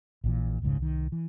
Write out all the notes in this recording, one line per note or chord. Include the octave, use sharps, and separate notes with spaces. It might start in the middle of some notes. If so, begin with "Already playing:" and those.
A#1 A#2 E3
F1 C#2 G#2 C#3
C2 D#3
E3